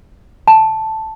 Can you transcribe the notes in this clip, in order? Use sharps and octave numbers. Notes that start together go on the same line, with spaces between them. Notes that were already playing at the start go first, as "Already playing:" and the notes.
A5